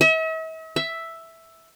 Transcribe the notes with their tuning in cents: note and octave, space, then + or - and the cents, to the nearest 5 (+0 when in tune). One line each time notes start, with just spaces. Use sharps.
E5 -45
E5 +0